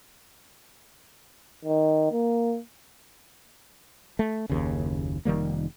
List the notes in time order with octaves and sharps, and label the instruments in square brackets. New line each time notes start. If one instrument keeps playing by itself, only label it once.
[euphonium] D#3
A#3
[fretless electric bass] A3
F#1 D#2 C#3
F1 D#3 G3 A#3